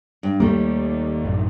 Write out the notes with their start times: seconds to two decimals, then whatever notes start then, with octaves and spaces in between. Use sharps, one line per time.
0.23 G2
0.40 D#2 G3 A3 A#3
1.25 A1 F#2